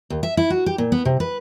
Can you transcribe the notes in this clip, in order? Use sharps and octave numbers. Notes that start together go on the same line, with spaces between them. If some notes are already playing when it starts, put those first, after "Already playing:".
D#2
E5
E4
F#4
G4
A#2
B3
C3
B4